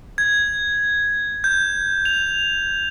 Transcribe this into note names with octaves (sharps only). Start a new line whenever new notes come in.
G#6
G6
F7